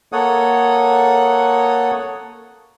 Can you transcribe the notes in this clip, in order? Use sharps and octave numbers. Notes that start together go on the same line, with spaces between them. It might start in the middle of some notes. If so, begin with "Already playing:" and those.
A#3 A4 C#5 F#5 D#6